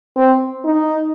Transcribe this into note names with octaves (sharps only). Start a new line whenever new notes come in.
C4
D#4